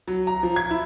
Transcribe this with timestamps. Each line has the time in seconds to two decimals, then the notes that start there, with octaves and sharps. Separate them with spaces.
0.08 F#3
0.27 A#5
0.43 F3
0.56 G#6
0.70 E4